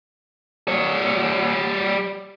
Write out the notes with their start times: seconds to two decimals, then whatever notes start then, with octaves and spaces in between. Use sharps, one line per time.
0.68 G3 C#5